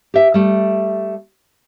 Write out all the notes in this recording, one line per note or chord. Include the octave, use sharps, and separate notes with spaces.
G4 E5
G3 A3